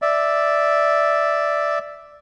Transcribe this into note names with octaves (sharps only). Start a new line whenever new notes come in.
D5 E5